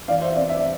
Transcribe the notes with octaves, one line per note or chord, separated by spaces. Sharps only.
E3 D5 F5
C5 E5
C4 D5
E5
D5